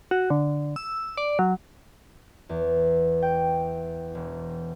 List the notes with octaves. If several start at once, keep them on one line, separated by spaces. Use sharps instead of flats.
F#4
D3
E6
D5
F#3
E2
G5
E1